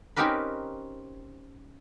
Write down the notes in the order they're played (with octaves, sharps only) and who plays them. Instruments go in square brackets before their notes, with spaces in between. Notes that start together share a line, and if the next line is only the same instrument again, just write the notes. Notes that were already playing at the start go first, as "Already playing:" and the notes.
[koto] C4 C#4 D#4 G4 A#4 B4